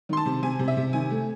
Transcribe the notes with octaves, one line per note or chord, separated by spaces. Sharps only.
D#3 C6
A5
C3
C3 G#5
C3
E5
C3
D#3 G#5
A3